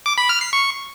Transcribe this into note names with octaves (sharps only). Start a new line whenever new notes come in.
D6
B5
F6
C7
C#6